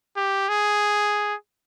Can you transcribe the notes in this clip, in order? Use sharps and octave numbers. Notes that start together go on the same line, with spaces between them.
G4
G#4